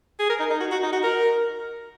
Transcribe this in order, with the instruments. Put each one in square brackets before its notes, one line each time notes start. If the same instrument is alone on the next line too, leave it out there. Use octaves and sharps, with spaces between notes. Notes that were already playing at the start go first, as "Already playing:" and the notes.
[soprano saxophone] G#4
A#4
D#4
D#4
F#4
F#4
D#4
F#4
A#4